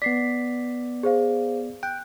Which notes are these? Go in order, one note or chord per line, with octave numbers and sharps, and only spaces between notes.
B3 D5 B6 C7
G#4 C5 F5
G5 F#6